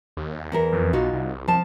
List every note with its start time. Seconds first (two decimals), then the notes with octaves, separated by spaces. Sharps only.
0.17 D#2
0.52 E2 E3 A#4
0.73 F2
0.93 B1 D#4 F4 F#4
1.13 C2
1.48 F3 A5